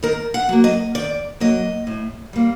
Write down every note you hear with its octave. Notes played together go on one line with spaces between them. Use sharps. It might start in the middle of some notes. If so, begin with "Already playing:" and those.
D#3 A#4
F#5
F#3 A#3
D#5
D#3 D5
F#3 A#3 D#5
A2
G3 A#3